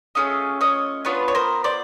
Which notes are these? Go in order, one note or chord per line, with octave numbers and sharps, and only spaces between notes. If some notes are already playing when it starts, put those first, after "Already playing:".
A3 C#4 F4 G#4 D#5 F5
C#5 D#5
B3 D4 F4 B4 C#5
C#5
A#4 C5
C5 D5